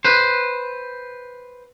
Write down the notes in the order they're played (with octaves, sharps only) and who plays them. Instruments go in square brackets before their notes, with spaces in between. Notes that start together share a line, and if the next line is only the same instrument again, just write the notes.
[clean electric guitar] B4 C5